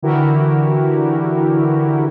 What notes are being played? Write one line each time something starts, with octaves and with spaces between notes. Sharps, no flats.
D3 E3 E4 F#4 G4 A#4